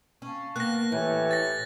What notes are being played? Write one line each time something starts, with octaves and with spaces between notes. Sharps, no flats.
C#4 F5 A5 C#6
A#3 B3 F#6 A#6
A2 E3 G4 A4 C#5
A6 A#6